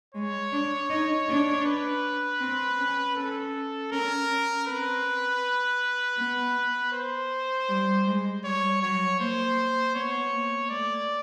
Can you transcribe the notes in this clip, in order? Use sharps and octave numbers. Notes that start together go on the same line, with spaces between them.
G#3 C#5
D4
D#4
D4
B4
C4
C#4
C#4 A4
C#4 A#4
C#4
C4 B4
B3
C5
G3
G#3
G3 C#5
F#3 C#5
A#3 C5
B3 C#5
A#3
A3 D5